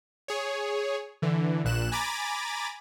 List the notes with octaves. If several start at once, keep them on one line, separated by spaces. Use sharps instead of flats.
G#4 C#5
D3 E3
A#1 A#2 F#6 E7
G#5 A#5 B5 D6 A6